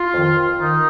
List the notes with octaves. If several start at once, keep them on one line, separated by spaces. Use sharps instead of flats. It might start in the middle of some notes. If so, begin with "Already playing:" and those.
Already playing: F4
F2 D#3
D#3 D#4